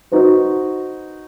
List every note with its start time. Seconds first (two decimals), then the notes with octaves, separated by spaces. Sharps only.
0.12 D#4 F#4 B4 C5